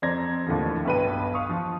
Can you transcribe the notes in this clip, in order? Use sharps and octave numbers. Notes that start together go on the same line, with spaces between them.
F2 C5 D5 A#5 G#6 A#6
D#2 A2 D3 F3
B1 G2 B4 G5 D#7
F5 C#6 D#6
F3 F4